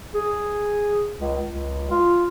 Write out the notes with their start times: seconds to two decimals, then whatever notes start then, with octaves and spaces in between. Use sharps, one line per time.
0.15 G#4
1.19 C#2
1.45 C#2
1.90 F4